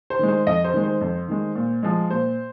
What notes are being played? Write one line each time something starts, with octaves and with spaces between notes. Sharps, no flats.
C5
D#3 G#3
C5
F2 D#5
C5
D#3 G#3
C5
F2
D#3 G#3
A#2
F3 G#3
A#2 C5